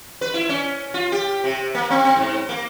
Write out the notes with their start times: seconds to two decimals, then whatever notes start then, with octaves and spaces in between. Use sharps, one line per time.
0.21 B4
0.34 E4
0.49 C#4
0.94 F4
1.12 G4
1.44 C3
1.75 A#3
1.90 C4
2.04 C4
2.16 G#2
2.49 A#3